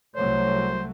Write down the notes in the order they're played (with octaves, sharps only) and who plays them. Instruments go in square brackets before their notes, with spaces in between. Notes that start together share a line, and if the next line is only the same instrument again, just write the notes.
[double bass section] C2 F#3 A3 [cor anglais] C5 [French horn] C#5